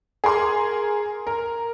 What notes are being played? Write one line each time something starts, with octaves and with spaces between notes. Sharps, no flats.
G#4 A#4 C6
A#4